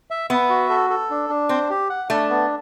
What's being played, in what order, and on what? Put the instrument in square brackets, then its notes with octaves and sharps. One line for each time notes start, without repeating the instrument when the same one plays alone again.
[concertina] E5
[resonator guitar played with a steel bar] B3 [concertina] E5
[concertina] F#4
A4
A4
D4
D4
[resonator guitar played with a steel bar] C4 [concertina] C5
[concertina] G4
F#5
[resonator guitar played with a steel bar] A3 [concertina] D4
[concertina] B3